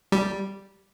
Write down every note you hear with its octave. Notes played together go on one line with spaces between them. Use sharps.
G3